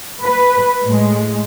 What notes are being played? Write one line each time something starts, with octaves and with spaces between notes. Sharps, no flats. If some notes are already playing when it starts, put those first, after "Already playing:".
B4
A2 G#3